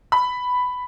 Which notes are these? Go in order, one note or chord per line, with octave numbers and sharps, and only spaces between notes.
B5